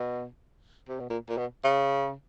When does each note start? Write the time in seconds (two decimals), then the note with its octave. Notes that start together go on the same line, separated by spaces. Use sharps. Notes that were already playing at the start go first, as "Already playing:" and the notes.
Already playing: B2
0.88 C3
0.99 B2
1.09 A#2
1.29 A#2
1.37 B2
1.64 C#3